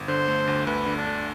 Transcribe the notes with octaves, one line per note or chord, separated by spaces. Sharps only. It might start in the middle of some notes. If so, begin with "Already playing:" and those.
Already playing: G1
D3 C5
A3
D2
D2 B4
D3
D4
D3